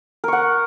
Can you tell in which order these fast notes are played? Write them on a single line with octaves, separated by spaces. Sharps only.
A#4 C#6 F#5